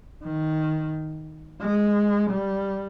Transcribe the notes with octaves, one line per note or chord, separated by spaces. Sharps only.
D#3
G#3
G3